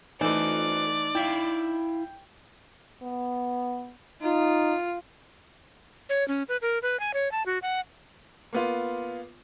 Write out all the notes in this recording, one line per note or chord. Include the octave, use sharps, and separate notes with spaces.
E3 A3 D#4 A4 C5 D5
E4 E5 F5 G5
B3
D#4 F4
C#5
C#4
B4
A#4
B4
G#5
C#5
A5
F#4
F#5
A#3 B3 F4